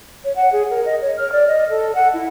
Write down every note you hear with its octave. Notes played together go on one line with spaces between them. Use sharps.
C#5
F#5
G#4
A#4
D#5
C#5
F6
D5
D#5
A4
F#5
E4